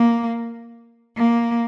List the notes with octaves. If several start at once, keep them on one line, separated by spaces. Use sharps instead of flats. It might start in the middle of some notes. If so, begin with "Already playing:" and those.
Already playing: A#3
A#3